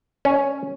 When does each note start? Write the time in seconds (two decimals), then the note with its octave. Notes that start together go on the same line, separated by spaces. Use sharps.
0.25 C#4